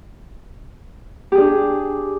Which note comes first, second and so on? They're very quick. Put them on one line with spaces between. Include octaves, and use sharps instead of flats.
G4 G#4 D4